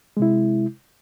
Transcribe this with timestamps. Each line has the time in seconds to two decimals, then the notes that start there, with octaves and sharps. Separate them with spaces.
0.17 G#3
0.19 C3
0.22 E4